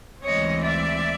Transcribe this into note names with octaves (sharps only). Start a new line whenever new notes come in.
D2 C#3 E3 G#3 C4 C#5 D#5
D5 E5